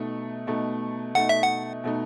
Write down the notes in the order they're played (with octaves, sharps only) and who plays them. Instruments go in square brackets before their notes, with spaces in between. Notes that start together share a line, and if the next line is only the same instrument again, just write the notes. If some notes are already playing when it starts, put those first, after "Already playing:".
Already playing: [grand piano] B2 A3 D#4
B2 A3 D#4
[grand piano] B2 A3 D#4 [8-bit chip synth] F#5
[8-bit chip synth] E5
F#5
[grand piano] B2 A3 D#4